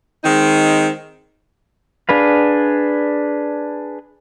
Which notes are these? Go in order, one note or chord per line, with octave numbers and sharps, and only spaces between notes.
D#3 G#3 C4 D#4
D4 G#4 B4 F5